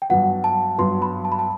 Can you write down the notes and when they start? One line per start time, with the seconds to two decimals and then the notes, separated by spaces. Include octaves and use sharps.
0.02 G5
0.10 G2 F#3 B3 F#5
0.44 A5
0.78 G2 F#3 B3 C6
1.02 B5
1.25 A5
1.32 B5
1.39 A5